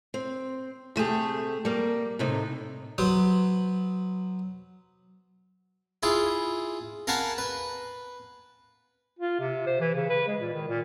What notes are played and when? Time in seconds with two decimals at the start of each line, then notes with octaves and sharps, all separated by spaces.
0.14 C4
0.96 C3 A3 G4 G#4
1.65 G3 A#3
2.19 A2 C3 D#4
2.98 F#3 B3 C5
6.03 E4 F4 G#4
7.07 A#4 F5 F#5 G#5 A5 B5
7.38 B4
9.19 F4
9.40 C3
9.66 C5
9.80 E3
9.95 C#3
10.09 B4
10.28 G#3
10.41 A#2
10.53 D#3
10.68 A#2